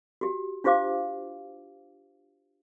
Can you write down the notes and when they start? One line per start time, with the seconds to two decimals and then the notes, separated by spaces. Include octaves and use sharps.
0.21 F#4 G4
0.64 D4 F4 G4 C5 F5 D6